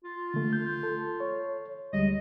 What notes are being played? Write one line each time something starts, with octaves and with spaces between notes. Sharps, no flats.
F4
D3 A3
G6
A4
C#5
D2 G3 G#3 D#5